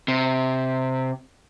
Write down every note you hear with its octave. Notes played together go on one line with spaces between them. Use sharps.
C3